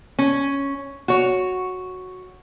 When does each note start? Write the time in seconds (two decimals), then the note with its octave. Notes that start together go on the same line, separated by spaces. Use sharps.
0.19 C#4
1.08 F#4 C#5